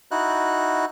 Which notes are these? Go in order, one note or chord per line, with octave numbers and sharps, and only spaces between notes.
D#4 E4 F#4 F#6